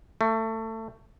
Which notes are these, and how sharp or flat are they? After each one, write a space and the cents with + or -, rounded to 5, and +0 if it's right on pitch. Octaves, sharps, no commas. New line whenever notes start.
A3 +25